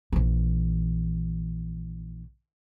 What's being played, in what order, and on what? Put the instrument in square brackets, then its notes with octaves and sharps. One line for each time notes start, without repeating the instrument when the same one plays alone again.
[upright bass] A#1 E3